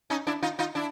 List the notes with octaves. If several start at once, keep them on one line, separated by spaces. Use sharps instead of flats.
C#4 D#4
D4 E4
D#4 F4
D#4 F4
D4 E4